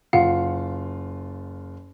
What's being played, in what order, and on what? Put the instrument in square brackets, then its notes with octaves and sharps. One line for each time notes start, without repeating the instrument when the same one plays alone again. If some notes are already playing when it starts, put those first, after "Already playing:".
[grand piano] F#1 F4 [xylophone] F5 F#5